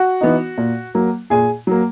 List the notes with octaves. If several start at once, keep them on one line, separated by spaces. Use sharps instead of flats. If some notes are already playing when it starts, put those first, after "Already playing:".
Already playing: F#4 F#5
E3 B3 D#4
A#2
F#3 A#3
A#2 G#4 G#5
F#3 A#3